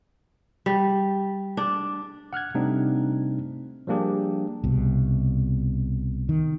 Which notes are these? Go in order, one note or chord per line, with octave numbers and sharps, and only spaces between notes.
G3
D4
F#5 F6 F#6 G#6
C3 G3 A3 C4 D4 D#4
F3 G3 A#3 D4 G4 G#4
C2 B2
D#3